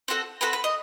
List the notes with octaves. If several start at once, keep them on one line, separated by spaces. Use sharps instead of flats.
C4 F#4 A4
C4 F#4 A4 B4
B4
D#5